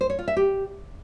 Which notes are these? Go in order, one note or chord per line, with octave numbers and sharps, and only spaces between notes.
C5
C#5
F4
E5
G4